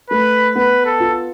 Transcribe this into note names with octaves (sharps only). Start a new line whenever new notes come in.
A3 B4
B3 B4
A4
F4